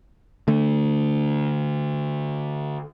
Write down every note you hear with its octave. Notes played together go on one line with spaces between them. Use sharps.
D3 A3